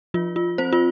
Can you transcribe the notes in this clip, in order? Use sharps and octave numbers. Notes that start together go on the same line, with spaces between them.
F3 F4
F4
C4 C5
F4